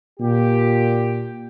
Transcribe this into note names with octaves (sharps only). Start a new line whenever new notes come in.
A#2 G4